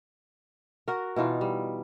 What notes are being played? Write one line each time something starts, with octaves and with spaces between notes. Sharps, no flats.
F#4 A#4
B2 E3 D#4 F4
G3